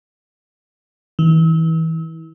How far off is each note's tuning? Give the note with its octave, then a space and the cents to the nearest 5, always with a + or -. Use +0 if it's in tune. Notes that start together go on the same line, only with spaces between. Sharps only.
E3 -35